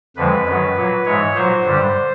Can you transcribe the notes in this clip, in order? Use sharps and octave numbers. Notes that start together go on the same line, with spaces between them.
F2 D3 F3 G#3 B4
F#2 D#3 F#3
A#2 F#3
G#2 E3 G#3 C#5
A#2 F#3 C5
G2 D3 G3